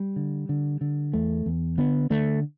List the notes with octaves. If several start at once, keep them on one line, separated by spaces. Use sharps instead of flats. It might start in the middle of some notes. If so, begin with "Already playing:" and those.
Already playing: G3
D3
D3
D3
E2 A3
E2
D3 B3
D3 A3